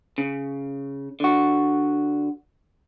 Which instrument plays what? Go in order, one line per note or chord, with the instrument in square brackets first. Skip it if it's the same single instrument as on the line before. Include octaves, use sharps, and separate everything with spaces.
[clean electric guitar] C#3
D3 F#4